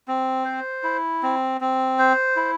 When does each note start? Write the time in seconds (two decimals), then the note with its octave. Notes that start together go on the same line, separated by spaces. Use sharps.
0.08 C4
0.45 C5
0.84 E4
1.23 C4
1.61 C4
1.99 C5
2.36 E4